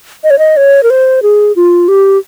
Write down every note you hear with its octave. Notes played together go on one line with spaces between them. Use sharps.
D#5
C#5
D#5
C#5
A#4
C5
G#4
F4
G4